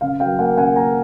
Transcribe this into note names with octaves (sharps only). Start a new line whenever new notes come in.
C#3 F5
F#3 F5 G5
A#3 F#5 G#5
C#3 F#5 G#5
A#3 G#5 A#5